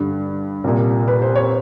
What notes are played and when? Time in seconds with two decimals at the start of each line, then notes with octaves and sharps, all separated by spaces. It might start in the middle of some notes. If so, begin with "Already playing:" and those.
Already playing: G2 D3
0.64 C2 A#2
1.08 B4
1.22 C5
1.35 C#5